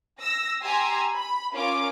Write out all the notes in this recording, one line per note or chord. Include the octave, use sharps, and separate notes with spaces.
E6 A#6
G4 G#5 A#5 C6 E6
B5
C#4 F4 A#4 D6